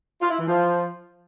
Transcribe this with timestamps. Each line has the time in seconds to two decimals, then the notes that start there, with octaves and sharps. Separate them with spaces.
0.21 F4
0.30 E4
0.39 E3
0.48 F3